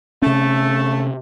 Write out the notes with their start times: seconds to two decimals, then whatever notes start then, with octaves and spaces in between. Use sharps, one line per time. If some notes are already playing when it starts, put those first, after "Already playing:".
0.22 C3 A3 C#4